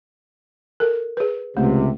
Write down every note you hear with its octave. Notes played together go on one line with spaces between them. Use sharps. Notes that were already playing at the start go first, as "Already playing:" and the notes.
A4 A#4
G#4 B4
C#2 C3 A3